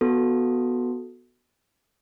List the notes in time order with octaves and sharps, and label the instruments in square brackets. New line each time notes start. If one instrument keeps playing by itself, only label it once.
[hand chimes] B3 F#4 A4